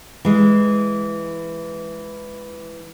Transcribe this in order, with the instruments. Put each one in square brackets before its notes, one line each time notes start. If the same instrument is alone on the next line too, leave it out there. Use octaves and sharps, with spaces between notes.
[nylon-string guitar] E3 G#3